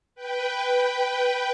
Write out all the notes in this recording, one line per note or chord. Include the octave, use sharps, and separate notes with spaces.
B4 G5